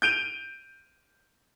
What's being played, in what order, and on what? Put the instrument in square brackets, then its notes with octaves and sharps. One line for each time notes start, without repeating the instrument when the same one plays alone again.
[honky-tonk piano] G6 D7 D#7 F7